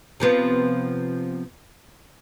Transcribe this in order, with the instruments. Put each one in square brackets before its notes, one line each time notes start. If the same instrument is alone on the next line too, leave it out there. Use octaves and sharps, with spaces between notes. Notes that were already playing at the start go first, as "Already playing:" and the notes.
[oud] C3 F3 B3